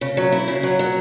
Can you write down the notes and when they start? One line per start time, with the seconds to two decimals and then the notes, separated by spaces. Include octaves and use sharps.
0.01 C#3
0.17 F#3
0.32 E4
0.48 C#3
0.63 F#3
0.79 F#3